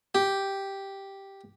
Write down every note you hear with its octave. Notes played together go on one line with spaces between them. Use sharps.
G4